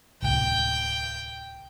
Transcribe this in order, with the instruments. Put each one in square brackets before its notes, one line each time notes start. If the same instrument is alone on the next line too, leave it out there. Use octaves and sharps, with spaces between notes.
[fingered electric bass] D1 C2 [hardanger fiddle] G5